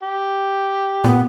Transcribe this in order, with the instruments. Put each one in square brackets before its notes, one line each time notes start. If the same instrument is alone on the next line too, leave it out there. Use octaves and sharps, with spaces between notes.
[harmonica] G4
[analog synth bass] A#2 [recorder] B3